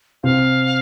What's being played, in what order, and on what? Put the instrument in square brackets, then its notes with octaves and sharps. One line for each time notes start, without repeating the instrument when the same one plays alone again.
[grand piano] C3 C4 [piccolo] F5